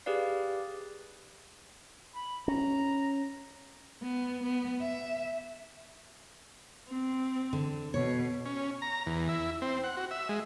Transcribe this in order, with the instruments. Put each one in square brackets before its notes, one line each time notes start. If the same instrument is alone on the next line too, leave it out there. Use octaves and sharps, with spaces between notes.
[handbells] G4 G#4 B4 D5 F5
[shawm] B5
[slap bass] C#4 [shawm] A#5
[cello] B3
B3
E5
C4
[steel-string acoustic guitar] D3
[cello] B2 [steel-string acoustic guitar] C#5
[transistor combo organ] C#4
A#5
E2
E4
C4
F#5
F#4
E5
G#3